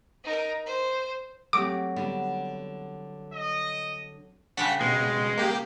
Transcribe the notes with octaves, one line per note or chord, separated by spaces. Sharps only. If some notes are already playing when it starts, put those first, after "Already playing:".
D#4 A#4
C5
F#3 A3 C4 G4 D6
D3 G3 B3
D#5
C#3 G3 D4 F#5 B6
B2 G#3
A#3 G4